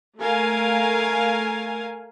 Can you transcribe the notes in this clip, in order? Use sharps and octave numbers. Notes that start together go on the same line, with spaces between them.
A3 A#4 F5 G#5